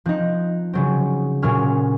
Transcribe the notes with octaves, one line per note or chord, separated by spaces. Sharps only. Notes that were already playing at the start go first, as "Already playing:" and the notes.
F3 C4 D#4 F#6
C#3 F#3 C4
A#2 F#3 C#4 F6